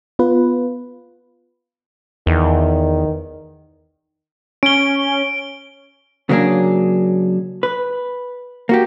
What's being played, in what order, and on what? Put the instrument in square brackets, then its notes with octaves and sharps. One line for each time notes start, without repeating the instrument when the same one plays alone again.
[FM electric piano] B3 F4 B4
[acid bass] E2 [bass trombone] D#3
[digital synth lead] C#4 [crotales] D7 G7
[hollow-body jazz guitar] C#3 F#3 A#3 D4 G#4
B4
A#3 F#4 G4